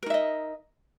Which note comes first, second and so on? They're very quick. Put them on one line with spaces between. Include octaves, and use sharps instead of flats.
A#4 D#4 E5 D#5